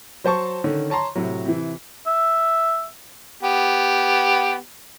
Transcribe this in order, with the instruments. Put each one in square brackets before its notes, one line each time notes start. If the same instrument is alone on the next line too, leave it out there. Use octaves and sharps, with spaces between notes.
[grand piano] F#3 C5 A5 C#6
D3 D#3 C#4
C#5 A5 A#5 C6
A2 C3 F#3
C3 E3
[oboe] E5
[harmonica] B3 G4